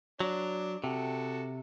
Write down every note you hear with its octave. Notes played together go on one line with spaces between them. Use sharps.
F#3 D4
C3 F#4 A4